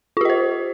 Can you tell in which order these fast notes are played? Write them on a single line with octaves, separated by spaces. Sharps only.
F4 G4 D#5 C5